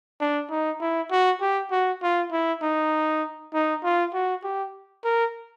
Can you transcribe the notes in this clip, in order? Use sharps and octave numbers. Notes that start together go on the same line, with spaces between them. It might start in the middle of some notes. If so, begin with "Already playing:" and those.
D4
D#4
E4
F#4
G4
F#4
F4
E4
D#4
D#4
F4
F#4
G4
A#4